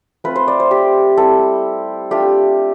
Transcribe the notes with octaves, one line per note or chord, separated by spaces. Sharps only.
A3 C4 F4 B4
C5
D5
C5
G4
G3 C4 E4 A4
A3 D4 F4 G4